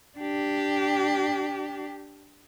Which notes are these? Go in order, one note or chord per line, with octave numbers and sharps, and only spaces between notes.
D4 G4